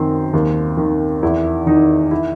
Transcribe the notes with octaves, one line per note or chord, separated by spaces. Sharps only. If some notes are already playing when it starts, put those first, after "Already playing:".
Already playing: F#2 D#3 C4
D#2
D#3
E2 E4
D#3 D#4
E4